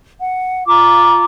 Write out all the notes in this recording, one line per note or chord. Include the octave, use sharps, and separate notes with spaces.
F#5
F4 A#5 D6